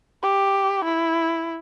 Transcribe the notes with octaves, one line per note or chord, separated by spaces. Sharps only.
G4
E4